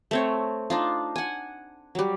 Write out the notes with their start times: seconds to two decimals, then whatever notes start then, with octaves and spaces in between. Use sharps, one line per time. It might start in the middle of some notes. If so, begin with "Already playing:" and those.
0.11 A3 C4 C#5
0.70 D4 D#4 F4
1.16 F#5 G#5
1.95 F#3 G3